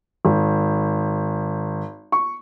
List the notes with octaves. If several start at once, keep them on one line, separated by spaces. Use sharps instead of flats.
G#1
C#6